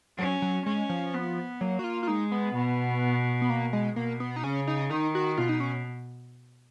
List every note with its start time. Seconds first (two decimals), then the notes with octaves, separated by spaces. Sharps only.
0.18 F#3 C#4
0.42 F#3
0.65 G#3 C#4
0.89 F3
1.14 B3
1.61 F#3 A#3
1.79 F#4
1.84 F4
2.03 F4
2.07 G#3 D#4
2.32 B3
2.54 B2
3.42 B3
3.50 A#3
3.73 G#3
3.96 B2 A#3
4.20 B3
4.36 D#4
4.44 C#3 C#4
4.67 D#4
4.90 D#3 D#4
5.15 F#4
5.37 B2 F4
5.49 D#4
5.60 C#4